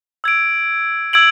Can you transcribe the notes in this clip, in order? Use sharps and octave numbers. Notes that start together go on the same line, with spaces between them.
E6 G#6 D7
E6 G#6 D7 F#7